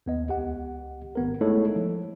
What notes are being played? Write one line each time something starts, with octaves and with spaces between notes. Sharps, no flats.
D#2 B3 D#5
C#2 G4 F#5
G#1 B3 A#4
G#3 A3 D#4 E4 A4 C#5
F3